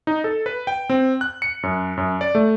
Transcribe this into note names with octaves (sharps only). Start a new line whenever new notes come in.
D#4
A4
B4
G5
C4
F#6
C#7
F#2
F#2
D5
A3